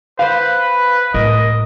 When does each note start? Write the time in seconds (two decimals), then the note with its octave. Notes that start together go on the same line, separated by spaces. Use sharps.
0.19 B4 C5 F5
1.14 A2 G#3 A#4 D#5